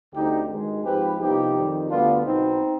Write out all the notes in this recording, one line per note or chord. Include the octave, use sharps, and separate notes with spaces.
D2 D3 G3 C4 D#4 G4
G#1 G2 D#3 G#3
G#2 F3 C4 G4 B4
C2 C3 F3 B3 D#4 G4
F2 D#3 G3
D2 D3 G3 B3 D4 F4
B1 B2 B3 C4 D#4